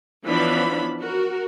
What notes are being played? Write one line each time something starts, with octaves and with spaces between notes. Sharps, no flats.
E3 F3 B3 C#4 D4 B5
F#4 A#4